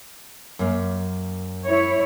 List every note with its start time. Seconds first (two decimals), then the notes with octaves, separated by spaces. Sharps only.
0.59 F#2 A#3
1.66 E4 C#5